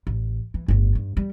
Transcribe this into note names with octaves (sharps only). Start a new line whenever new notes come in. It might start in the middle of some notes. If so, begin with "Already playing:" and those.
A1
E3
G1 A2
G2
G3